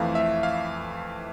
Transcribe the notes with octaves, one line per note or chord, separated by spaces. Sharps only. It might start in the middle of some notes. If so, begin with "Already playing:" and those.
Already playing: F2 E3 A3 F5
E5
F5